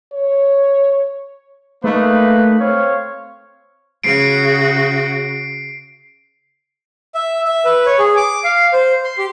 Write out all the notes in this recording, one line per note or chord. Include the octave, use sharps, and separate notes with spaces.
C#5
A3 A#3 D#4 B4
C4 C#5 F5
C#3 F#4 C7 D7
E5
E5
B4
C#5
G#4
D6
F5
C5
C6
G4